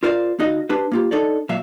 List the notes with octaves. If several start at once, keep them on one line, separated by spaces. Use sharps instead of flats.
F4 A#4 C5 D5 D#5 F5
D2 D#4 F#4 D#5 F5
D4 G4 B4 C5
A#3 F4 G4
D4 D#4 A4 C#5 D5
A#2 F#3 E5 F5